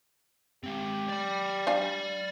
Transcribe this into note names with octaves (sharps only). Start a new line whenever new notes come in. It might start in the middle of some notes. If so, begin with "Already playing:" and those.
G#3 C4 G4
D5 B5
D4 F5 G#5